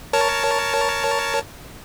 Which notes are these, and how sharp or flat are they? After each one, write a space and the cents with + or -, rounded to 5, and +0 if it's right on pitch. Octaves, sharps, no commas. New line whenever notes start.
A#4 +0 C#5 +10 A5 +0